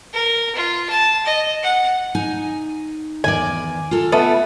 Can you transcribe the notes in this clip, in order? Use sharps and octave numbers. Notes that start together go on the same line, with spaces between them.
A#4
F4
A5
D#5
F#5
D#4 G#5
E2 D#3 D5 G#5
F4 A4
A3 B3